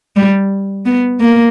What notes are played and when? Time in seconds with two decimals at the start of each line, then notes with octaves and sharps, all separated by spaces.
0.16 G3
0.86 B3
1.20 A#3